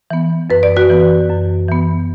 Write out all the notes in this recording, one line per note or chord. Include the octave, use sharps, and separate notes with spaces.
E3 B3
F#2 B4
D5
F#4 B4
E3 B3
F#2
E3 B3